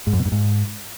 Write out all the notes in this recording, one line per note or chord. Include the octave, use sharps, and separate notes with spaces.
G#2
F#2
B2
G2
G#2